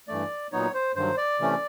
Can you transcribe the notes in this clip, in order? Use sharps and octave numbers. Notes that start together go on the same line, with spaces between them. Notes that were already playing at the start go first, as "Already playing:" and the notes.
G2 E3 A3 D5
A#2 F#3 B3 D#4 C#5
C5
G2 D#3 F#3 C5
D5
C3 E3 A3 C#4